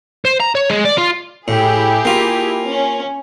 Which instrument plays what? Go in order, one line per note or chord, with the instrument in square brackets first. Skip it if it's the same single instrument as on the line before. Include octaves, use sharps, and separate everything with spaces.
[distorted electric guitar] C5
A#5
C#5
G#3
D5
F4
[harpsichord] A2 [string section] E4 G4 G#4
[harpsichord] A#3 F4
[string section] C#4